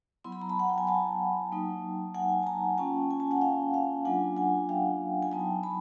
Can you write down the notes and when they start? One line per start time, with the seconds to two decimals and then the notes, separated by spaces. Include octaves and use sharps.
0.24 F#3 B3 E4 C6
0.32 B5
0.42 A#5
0.49 A5 B5
0.59 F#5
0.69 G5
0.78 G#5
0.87 G5 A5
1.52 F#3 A#3 D#4
2.14 F#5 G#5
2.43 A5
2.47 G#5 A#5
2.78 A#3 C#4 F4 G5 A5
3.11 G#5
3.20 A5
3.31 F#5 G#5
3.41 F5 G5
3.74 F5 G5
4.05 F#3 A#3 D4 F4 F#5 G#5
4.37 F#5 G#5
4.69 F5 G5
5.23 G#5
5.32 F#3 B3 D#4 G5 A5
5.63 A5 B5